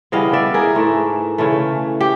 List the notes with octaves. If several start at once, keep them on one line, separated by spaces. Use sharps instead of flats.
C#3 E3 G3 B3 D#5 F5
D5 E5
G#4 A#4
G#2 E3 A3
C#3 E3 A3
G4